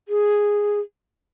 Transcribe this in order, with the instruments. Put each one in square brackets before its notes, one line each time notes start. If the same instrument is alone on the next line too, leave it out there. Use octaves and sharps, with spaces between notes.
[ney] G#4